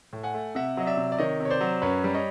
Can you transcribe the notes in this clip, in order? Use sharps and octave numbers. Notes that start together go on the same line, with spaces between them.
A2
F#5 G#5
A3
C3 E5 F#5
F#3 D#5
D5 E5
C3
D5
D#3 C#5 D#5
C3
C#5
C5 D5
F#3
F#2 B4 C#5
G3
C#5 D#5